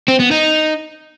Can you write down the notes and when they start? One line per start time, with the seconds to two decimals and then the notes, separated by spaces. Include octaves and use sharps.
0.08 C4
0.20 B3
0.31 D#4